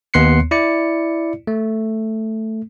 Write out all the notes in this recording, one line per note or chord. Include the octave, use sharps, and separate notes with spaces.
D#2 B3 C6 F#6 C7 C#7
E4 D5 C#7
A3